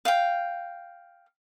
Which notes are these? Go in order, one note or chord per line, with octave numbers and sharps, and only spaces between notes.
F5 G5